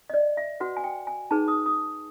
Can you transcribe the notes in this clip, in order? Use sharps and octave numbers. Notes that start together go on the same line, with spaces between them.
D#5
D5
E5
F#4 B4 F#5
G#5
G5
G#5
D#4 G#4 B4 A5
D#6
D#6